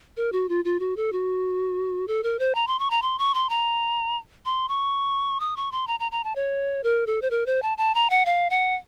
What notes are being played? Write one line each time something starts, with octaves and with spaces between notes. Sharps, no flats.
A#4
F#4
F4
F4
F#4
A4
F#4
A4
A#4
C5
A#5
C6
C#6
A#5
C6
C#6
C6
A#5
C6
C#6
D#6
C#6
C6
A#5
A#5
A#5
A5
C#5
A#4
A4
C5
A#4
C5
A5
A5
A#5
F#5
F5
F#5